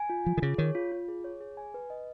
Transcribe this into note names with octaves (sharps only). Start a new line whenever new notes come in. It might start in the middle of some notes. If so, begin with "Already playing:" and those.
Already playing: G#5
F4
F3 F4
D#3
C#3 G#4
D#3 C#5
F4
F4
G#4
C#5
G#4
G#5
B4
D#5